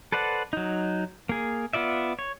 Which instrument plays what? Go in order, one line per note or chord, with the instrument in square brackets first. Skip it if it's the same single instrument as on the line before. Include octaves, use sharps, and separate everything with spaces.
[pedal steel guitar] A4 B4 C5 D5 F#5
F#3 D#4
A#3 G#4
B3 F4 D5 E5
C#5